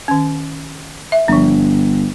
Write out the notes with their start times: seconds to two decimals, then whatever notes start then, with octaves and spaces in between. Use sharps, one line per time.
0.08 D#3 C#4
1.12 E5
1.28 G1 F3 D4